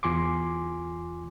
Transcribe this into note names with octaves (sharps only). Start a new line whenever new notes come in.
E2 F4 G#5 C6 D6